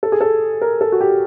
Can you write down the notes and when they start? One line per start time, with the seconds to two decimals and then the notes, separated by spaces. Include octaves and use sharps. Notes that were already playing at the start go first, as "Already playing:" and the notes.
0.03 A4
0.12 G#4
0.21 A4
0.61 A#4
0.81 A4
0.92 F#4
1.01 G4